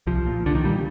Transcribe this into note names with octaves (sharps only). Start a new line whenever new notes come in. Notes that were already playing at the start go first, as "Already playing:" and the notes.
C2 F3
A#2
C2 D3
D#3
A#2 G3